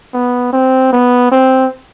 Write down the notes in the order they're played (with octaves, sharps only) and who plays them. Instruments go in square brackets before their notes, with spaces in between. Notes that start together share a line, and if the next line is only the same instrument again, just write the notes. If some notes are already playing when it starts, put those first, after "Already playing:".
[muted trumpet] B3
C4
B3
C4